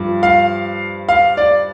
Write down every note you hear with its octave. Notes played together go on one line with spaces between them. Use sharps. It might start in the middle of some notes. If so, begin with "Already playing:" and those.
Already playing: G2 F3
F5
F5
D5